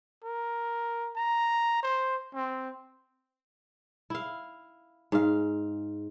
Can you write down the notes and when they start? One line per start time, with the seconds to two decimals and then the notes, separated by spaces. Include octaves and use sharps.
0.23 A#4
1.16 A#5
1.82 C5
2.35 C4
4.10 E4 F5
5.12 G#2 F5